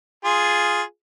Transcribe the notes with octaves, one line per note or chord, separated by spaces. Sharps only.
F4 G#4